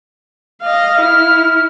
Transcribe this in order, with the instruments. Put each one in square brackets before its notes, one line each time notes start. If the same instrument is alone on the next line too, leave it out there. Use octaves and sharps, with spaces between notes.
[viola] D#5 F5
[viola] E4 [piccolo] F6